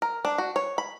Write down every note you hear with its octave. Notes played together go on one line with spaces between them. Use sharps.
A#4
D4
F#4
C#5
B5